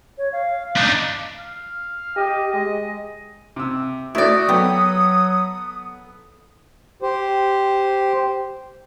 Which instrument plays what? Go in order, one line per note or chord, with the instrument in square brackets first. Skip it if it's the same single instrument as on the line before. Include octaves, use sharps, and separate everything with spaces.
[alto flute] C#5
F5
[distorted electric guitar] D4 D#4
[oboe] F5
[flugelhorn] G4 [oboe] D#5
[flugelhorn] G#3 [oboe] D#5
[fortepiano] C3 E6
[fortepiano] A3 [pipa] E4 D5 [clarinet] F#4 [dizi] D#6
[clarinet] F#3 [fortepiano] B3 A4 [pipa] G4
[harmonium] G4 C5